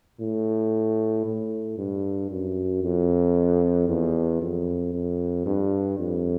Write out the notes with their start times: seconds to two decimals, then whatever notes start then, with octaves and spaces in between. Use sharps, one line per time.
0.21 A2
1.26 A2
1.78 G2
2.31 F#2
2.83 F2
3.89 E2
4.41 F2
4.94 F2
5.46 G2
5.99 F2